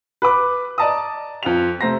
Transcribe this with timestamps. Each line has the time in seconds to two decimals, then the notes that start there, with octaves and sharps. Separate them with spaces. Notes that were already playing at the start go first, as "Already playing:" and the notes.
0.22 B4 B5 D6
0.78 D5 D#5 A5 A#5 D#6
1.43 F2 F4 F7
1.81 C3 A3 C5 A#5 A#6